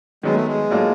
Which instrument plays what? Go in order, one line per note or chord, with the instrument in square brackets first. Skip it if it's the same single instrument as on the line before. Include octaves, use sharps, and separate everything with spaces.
[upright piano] D#3 F#3 B3 [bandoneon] G#3
[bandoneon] A3
G#3
[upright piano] A2 F#3 A#3 D4 F4